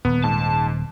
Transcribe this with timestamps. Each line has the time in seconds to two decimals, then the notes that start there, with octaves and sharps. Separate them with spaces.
0.05 D#1 B3
0.24 G#2 A5